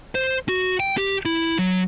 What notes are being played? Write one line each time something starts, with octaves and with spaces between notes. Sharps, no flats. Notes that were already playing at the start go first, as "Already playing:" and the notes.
C5
F#4
G5
G4
E4
F#3